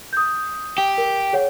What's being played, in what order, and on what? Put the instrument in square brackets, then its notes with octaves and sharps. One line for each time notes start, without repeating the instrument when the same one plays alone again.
[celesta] D#6 G6
[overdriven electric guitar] G4 [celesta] G5
[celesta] A#4
G#4 C#5 F#5